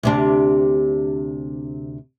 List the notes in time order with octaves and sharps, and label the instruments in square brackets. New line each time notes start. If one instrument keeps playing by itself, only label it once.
[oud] D2 C3 D4